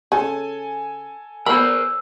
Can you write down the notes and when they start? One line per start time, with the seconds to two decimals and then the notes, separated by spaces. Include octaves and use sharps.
0.12 C#3 A4 G#5
1.46 B3 A#4 C5 B5 E6